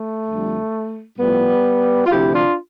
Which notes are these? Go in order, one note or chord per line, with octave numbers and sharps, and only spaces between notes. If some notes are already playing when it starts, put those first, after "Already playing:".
Already playing: A3
F2 D3 G3
A2 F3 G3 B3
F4
D2 C3 F3 E4 G4
D4 F4